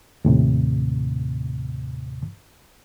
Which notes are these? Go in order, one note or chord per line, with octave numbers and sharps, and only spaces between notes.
D#2 A2 C3